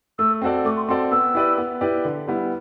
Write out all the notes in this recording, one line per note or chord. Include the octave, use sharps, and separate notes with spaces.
A3 E6
C4 F#4 A4 D5
A3 D6
C6
C4 F#4 A4 D5 C6
B3 E6
E4 G4 B4 D5
B3
E4 G4 B4 D5
D3
G3 B3 E4